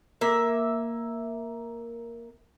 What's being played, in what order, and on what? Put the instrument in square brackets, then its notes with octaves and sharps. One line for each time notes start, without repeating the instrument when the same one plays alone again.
[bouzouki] A#3 E5